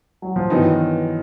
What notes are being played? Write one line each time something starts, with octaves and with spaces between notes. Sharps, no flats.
F#3
F3
G2 D#3 E3 F#3 B3 D#4